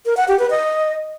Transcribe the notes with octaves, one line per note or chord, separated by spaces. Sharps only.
A#4
F#5
G4
B4
D#5